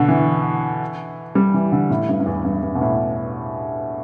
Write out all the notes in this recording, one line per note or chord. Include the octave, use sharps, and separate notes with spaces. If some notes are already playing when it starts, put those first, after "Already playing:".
Already playing: B2 D3
E3
G3
E3
D3
A2
G2
G2
E2
G2
G2
B2
A2